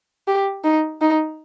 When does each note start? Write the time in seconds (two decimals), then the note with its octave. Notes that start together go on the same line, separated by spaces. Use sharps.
0.28 G4
0.64 D#4
1.01 D#4